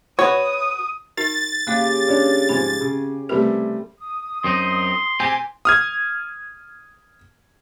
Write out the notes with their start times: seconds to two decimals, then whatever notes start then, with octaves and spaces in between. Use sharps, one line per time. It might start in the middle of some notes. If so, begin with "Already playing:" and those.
0.19 F#4 B4 C#5 D#6
1.17 D#4 F#4 A#4 A6
1.67 C#3 A#3 G4 F5
2.07 C#4 D4 C#5
2.49 G#2 F3 G#5 B5
2.81 C#3
3.29 C3 G3 A3 A#4 B4
3.99 D#6
4.44 F#2 C4 D#4 C6
5.20 C4 G4 G#5
5.65 D#6 F6 G#6